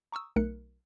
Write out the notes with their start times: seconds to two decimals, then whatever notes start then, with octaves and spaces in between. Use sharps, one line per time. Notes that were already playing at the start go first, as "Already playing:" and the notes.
0.12 A#5 C#6 D#6 E6
0.36 B1 A3 A#4 F#6 C#7